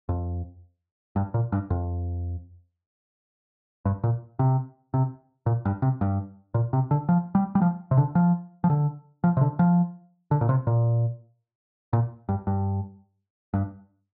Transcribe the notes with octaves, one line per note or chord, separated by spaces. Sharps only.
F2
G2
A#2
G2
F2
G2
A#2
C3
C3
A#2
G2
C3
G2
A#2
C3
D3
F3
G3
G3
F3
C3
D3
F3
F3
D3
F3
C3
D3
F3
D3
A#2
C3
A#2
A#2
G2
G2
G2